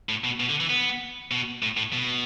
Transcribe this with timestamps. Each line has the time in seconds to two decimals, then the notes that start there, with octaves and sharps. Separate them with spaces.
0.09 A2
0.24 B2
0.40 B2
0.50 D3
0.60 E3
0.70 B3
1.31 B2
1.63 A2
1.77 A2
1.93 B2